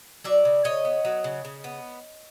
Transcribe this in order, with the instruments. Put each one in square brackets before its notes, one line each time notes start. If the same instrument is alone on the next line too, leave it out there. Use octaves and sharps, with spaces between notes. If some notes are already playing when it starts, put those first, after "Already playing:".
[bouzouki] F#3 D5 E5
C#3
C#3 C#5 D#5
B3
F#3
C#3
C#3
B3